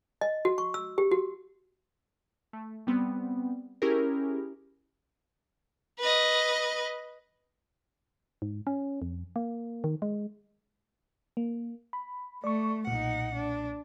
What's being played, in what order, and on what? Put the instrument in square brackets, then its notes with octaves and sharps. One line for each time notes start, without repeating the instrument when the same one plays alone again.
[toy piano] D#5
F#4
C#6
E6
G4
F#4
[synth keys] A3
G3 B3 C4
C#4 E4 G4 G#4 A#4
[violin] B4 D#5
[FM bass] G#2
C#4
F2
A#3
D#3
G#3
[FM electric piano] A#3
B5
[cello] A3 [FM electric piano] D5 C#6
[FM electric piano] B1 A#2 [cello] D#4 F#5
[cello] D4